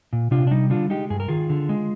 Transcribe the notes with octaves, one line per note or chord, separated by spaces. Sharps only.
A#2
C3 D4 F4
D4
G3 D#4
D3 D4 F4
G#3 D#4 G4
G2 G#4
A#4
D#3 F4 G#4
D3
G#3